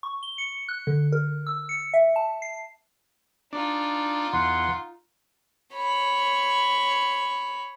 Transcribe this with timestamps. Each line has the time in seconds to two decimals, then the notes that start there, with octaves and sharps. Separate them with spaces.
0.03 C#6
0.23 G7
0.38 C#7
0.69 F#6
0.87 D3
1.12 A#4
1.47 E6
1.69 C#7
1.94 E5
2.16 A5
2.42 C7
3.53 D4 D#4 F4
4.33 E2 F#5 C6
5.76 C#5 B5